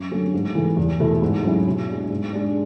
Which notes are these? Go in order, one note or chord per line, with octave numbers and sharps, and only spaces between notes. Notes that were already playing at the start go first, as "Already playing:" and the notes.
Already playing: F#2
D3 F#3 A3 C#4
G#2
E3 A3
E2
B2 A3 E4
G#2
F#3 C#4 E4
B2
G#3 D4
G#2
G#3 D4